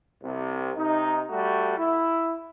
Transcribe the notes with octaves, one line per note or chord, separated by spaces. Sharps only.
C2 C3
C3 D#4
G3 A3 F#4
E4